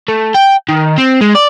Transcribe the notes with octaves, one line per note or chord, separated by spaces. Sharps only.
A3
G5
D#3
C4
G#3
D5